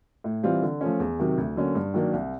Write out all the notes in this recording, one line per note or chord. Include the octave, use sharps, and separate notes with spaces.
A2
E3 G3 C4 F4
D3
F3 A3 C#4
E2
C3 D#3 F#3
D2
D3 F#3 A#3 C#4
G2
D#3 F#3 A#3 D4
C2